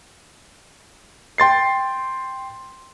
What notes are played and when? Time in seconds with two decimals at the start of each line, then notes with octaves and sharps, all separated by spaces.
1.38 G5 C6 A6 C7